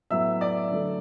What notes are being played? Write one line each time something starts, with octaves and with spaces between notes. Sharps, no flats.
A2 F#3 B3 E5 E6
D5 D6
D3 F#3 A3